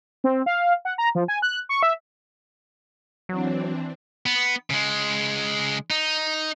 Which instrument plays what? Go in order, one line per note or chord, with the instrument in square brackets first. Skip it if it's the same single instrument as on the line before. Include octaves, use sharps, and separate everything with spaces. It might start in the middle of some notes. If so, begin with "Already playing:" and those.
[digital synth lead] C4
F5
F#5
A#5
F3
G#5
F#6
C#6
E5
[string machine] E3 C4 D4 [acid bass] F#3
[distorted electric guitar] B3
C#3 G#3
D#4